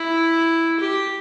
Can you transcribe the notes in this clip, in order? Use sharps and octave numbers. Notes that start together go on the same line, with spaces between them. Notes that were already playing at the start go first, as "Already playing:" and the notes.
Already playing: E4
G4